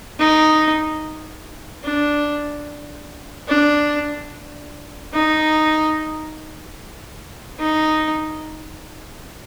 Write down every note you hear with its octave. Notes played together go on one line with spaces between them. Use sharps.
D#4
D4
D4
D#4
D#4